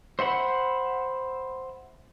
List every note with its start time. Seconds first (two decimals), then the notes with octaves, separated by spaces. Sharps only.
0.19 C5 E5 F#5 B5